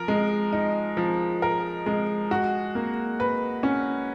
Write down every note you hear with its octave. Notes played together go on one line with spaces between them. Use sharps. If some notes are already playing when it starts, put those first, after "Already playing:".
Already playing: F3 A#4
G#3
D#4
F3
A#4
G#3
F#4
A#3
B4
C#4